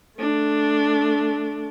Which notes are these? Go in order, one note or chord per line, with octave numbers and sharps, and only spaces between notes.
A3 D4